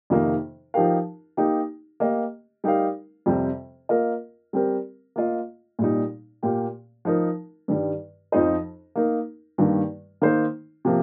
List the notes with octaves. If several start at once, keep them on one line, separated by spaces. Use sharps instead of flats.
F2 C3 D#3 A#3 D#4
F3 D#4 G4 A#4 F5
A#3 D#4 G4
A#3 G4 D#5
G3 D#4 G4 A#4 F5
F2 C3 G3 C4
A#3 F4 A#4 D#5
G3 C4 G4 A#4
A#3 F4 D#5
A#2 G3 D#4
A#2 A#3 G4
F3 D#4 A#4
G2 D#3 G3
F2 F3 D#4 C5 D#5
A#3 D#4 A#4
G2 D#3 G3 A#3
D#3 A#3 D#4 C5
C3 F3 A#3